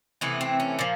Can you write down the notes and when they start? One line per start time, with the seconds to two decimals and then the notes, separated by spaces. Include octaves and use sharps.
0.21 C3 E3 A3 B3
0.41 C4
0.60 C#4
0.79 A#2 F3